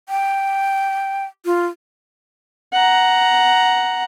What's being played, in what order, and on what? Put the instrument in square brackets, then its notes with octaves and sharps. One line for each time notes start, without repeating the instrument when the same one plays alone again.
[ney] G5
F4
[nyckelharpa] F#5 A#5